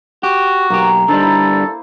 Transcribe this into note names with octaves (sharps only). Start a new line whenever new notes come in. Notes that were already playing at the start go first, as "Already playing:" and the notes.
F#4 G4
B1 A#3 G4
D3 G3 D#4 A4 C5
E4